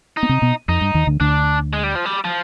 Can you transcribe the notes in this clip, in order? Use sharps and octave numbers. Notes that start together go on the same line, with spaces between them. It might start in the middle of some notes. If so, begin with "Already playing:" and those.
D#4
B3
C3 C4
B2 B3
F2 D#4
G2
D#2 D#3
D2 D3
D2 D3 D4
G#3
G3
F3
G3
F3